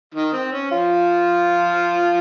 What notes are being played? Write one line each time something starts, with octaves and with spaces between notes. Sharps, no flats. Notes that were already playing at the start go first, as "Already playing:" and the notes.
D#3 D#4
C4
C#4
F3 F4